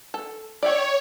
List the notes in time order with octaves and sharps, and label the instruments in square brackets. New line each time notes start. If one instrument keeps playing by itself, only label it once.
[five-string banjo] A4
[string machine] C#5 [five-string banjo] D5 E5 G5